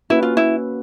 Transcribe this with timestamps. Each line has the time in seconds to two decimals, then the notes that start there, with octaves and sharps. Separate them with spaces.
0.10 A#3 C#4 E4 F#4 B4
0.23 F4
0.37 E4